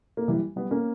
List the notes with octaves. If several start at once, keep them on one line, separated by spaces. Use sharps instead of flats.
A#3
E3 G3
G3 B3
A#3 C#4